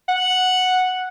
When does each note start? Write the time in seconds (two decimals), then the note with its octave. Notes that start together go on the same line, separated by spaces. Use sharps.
0.09 F#5